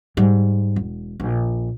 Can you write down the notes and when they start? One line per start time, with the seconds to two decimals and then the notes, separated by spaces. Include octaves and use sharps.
0.17 G#2 G3
0.76 E1
1.20 A#1